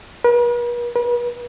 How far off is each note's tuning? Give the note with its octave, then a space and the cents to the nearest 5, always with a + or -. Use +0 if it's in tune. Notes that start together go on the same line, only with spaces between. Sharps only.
B4 -45
B4 -40